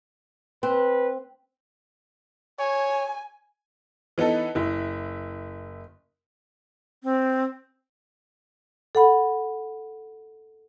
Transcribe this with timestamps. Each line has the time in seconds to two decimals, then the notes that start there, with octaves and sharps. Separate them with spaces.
0.63 C4 B4
2.59 C#5 G#5
4.18 E3 B3 D#4 A4
4.55 F#1 E4
7.03 C4
8.95 A4 F#5 B5